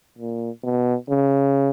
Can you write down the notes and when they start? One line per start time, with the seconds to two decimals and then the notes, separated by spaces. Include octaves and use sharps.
0.18 A#2
0.63 B2
1.09 C#3